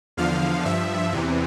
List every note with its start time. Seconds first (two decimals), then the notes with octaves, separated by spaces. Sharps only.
0.17 E2 D3 F3 F5
0.65 G2 F3 E5
1.12 E2 C3 E3